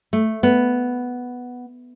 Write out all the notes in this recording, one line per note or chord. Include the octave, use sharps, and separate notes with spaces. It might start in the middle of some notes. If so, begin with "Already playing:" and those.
A3
B3